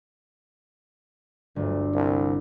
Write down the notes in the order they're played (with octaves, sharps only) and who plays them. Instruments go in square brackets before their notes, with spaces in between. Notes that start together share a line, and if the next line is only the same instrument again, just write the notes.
[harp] G1 [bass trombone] D2
[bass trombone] C2